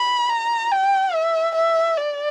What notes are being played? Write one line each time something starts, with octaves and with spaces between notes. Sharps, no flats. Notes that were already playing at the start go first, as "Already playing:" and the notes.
Already playing: B5
A#5
G5
E5
E5
D5